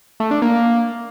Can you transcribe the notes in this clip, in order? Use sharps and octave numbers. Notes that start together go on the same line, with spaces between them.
A3
D4
A#3